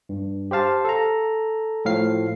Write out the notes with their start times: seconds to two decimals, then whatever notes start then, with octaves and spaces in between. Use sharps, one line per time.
0.09 G2
0.51 G4 C5 F5 A5
0.85 A4 A#5
1.85 A2 F3 F5 C7